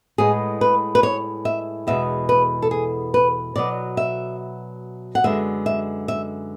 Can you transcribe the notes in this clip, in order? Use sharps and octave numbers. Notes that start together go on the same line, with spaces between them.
A2 G#3 B3 G#4
B4
B4
C#5
E5
E2 B2 G#3 B3 E5
B4
A4
G#4
B4
B2 F#3 B3 D5
E5
F#5
F#2 D3 G#3 B3 E5
E5
E5